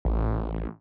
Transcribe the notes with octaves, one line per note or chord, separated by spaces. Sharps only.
A1